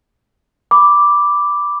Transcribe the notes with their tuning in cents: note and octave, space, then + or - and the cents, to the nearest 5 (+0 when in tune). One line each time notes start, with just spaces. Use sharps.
B5 +0 D6 +0